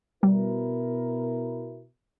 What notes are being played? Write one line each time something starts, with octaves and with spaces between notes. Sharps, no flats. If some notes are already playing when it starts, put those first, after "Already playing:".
B2 G3 E4 A#4